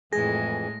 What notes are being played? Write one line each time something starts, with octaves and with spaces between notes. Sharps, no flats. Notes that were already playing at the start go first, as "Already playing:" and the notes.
F2 A2 E3 G#3 G#4 A#6